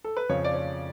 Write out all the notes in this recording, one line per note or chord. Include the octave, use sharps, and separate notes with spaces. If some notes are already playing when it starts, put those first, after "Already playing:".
A4
B4
F2 C#3 F3 C#5
D5
C#5